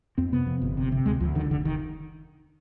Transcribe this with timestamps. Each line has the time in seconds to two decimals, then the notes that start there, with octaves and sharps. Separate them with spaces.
0.18 F2 C4
0.32 C3 B3
0.47 F2
0.62 G1
0.77 C3
0.92 C3
1.06 D2 G#3
1.20 D2 F3
1.35 D3 D#3
1.51 F1 D3
1.65 D#3